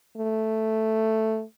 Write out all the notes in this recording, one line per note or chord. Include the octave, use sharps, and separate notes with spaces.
A3